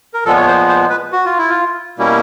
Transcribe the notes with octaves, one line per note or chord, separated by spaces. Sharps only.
A#4
A#2 F3 G#3 B3 A4
C#5
C5
C5
B4
F#4
F4
E4
F4
B2 G3 A#3 C#4 E4